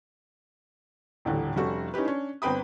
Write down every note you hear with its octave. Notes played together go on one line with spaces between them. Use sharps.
D#1 A1 A2 D3
F1 G3 C#4 F#4 A4 C#6
C#4 D#4 E4 G4 B4
C#4 D4
G1 C4 B4 G5 B5 D#6